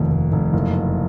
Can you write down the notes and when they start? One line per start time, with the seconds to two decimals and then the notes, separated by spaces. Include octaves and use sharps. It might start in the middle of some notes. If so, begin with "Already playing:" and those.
Already playing: F1 D#2
0.11 F1
0.32 F1
0.53 F#1